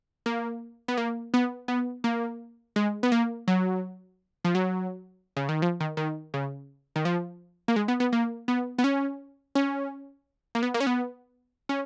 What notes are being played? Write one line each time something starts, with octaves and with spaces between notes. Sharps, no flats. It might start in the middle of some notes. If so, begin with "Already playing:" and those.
A#3
B3
A#3
B3
B3
A#3
G#3
B3
A#3
F#3
F3
F#3
C#3
D#3
F3
D#3
D#3
C#3
D#3
F3
A#3
G#3
B3
B3
A#3
B3
B3
C#4
C#4
A#3
B3
A#3
C#4
B3
C#4